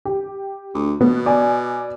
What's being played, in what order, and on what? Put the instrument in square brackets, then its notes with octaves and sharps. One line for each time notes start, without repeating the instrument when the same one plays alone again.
[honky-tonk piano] G4
[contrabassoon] D2
[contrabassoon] B2 [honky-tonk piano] B3
[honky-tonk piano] D5 G#5